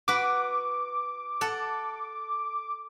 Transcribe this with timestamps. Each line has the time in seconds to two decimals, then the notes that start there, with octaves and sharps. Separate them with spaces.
0.08 F#4 B4 D6
1.41 A4 F#5